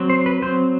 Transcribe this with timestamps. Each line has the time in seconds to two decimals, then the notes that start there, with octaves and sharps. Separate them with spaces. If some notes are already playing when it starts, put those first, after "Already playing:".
Already playing: F#3 C4
0.10 C5
0.26 B4
0.42 F#3 C4 C5